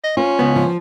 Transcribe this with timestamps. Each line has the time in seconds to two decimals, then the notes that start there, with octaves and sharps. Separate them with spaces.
0.04 D#5
0.17 C#4 F4 C5
0.39 C#2 B3
0.56 F3